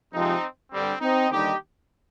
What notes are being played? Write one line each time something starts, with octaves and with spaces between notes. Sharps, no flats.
F2 C3 F3 G#3 C4 D#4
G2 D3 G3 C4
C4 D#4
D#2 D3 G3 D#4 G4